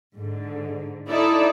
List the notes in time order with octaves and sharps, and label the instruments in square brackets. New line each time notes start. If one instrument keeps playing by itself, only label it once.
[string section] G#2 D3
D#4 E4 A4 D5